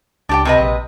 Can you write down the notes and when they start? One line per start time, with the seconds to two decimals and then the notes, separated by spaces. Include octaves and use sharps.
0.29 C#2 D4 G4 G5
0.45 C3 B4 D#5
0.58 A#1